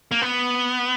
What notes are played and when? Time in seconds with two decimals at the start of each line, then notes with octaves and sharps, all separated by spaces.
0.11 A#3
0.22 B3